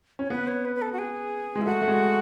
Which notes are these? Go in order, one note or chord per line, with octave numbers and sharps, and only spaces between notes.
C#4 C#5
B3 B4
C#5
B4
B4
A4
F#4
G#4
G#3
E4
A3 F#4
A3
G#3